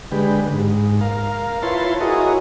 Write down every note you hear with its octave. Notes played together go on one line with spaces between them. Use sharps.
D3 G#3 G4 B4
G#2
A#4 F5
E4 F4 B4 C#5 A5 C6
E4 F#4 G#4 A#4 C#5 D#5